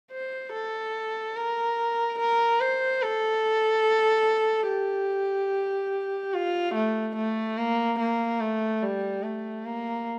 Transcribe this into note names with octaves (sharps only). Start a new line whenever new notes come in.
C5
A4
A#4
A#4
C5
A4
G4
F4
A3
A3
A#3
A#3
A3
G3
A3
A#3